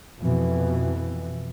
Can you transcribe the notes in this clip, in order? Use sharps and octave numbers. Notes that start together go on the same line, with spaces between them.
F2 B2 E3